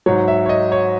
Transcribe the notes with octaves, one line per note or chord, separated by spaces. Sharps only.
G#2 F#3 C#5
E5
C#5
D#5
C#5